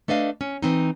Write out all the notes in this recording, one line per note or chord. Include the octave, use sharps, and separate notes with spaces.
A3 D4 B4 D#5 F5
C#4
E3 C4 D#4